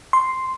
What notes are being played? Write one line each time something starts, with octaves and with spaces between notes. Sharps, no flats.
C6